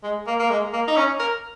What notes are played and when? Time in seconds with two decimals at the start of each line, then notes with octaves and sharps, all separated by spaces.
0.03 G#3
0.27 A#3
0.39 A#3
0.50 G#3
0.73 A#3
0.88 D#4
0.97 C#4
1.19 A#4